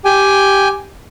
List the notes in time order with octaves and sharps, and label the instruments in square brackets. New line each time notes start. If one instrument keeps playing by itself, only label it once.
[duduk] G4 [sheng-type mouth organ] G5 G#5